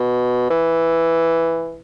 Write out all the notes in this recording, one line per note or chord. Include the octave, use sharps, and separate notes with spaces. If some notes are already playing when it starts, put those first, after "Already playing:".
Already playing: B2
E3